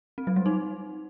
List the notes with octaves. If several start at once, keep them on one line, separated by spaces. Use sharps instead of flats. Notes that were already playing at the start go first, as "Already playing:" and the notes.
C4
F#3
G3
D#4